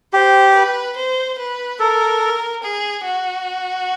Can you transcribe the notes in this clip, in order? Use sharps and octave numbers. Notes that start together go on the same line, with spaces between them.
G4 C5
B4
C5
B4
A4 A#4
G#4
F#4